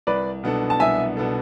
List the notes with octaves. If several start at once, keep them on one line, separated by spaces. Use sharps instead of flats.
C2 B4 D5
B2 B3 D4 A4
A5
C2 E5 G#5
B2 B3 D4 A4